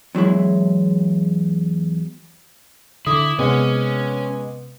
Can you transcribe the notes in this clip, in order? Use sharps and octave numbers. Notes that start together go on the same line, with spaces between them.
E2 F#3 G#3 E4
D3 E4 D6 D#6
C3 G#3 B3 C#4